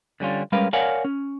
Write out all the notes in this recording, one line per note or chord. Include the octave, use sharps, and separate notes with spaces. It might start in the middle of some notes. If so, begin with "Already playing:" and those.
D3 G3 C#4 F4
G3 G#3 C#4 A#4 B4 F5
A#4 C#5 D5 F5 F#5 G#5
C#4